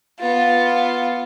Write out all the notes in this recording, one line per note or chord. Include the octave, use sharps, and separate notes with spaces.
B3 F4